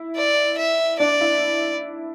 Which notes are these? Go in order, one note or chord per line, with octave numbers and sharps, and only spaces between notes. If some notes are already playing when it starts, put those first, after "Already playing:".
Already playing: E4
D5
E5
D4 D5
E4